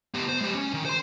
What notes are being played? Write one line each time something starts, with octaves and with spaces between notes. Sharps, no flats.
B3 G4
C5
G#3 G4
C#4
D#3
C5 C6